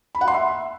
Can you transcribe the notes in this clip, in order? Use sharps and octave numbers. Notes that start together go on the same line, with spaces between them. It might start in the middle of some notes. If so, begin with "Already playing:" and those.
B5
F#5
C6
E5